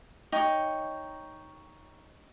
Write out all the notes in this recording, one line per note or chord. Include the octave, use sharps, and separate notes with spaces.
D#4 C#5 G5